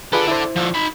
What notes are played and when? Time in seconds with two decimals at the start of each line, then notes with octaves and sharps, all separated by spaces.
0.13 F4 G#4 A4 B4 D5
0.28 E4 C5
0.56 D3 F3
0.75 D#4 B5